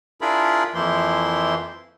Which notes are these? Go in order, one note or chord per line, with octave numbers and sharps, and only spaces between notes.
D4 E4 F4 G#4 A#4 B5
F2 E3 F3 A#3 E4 C6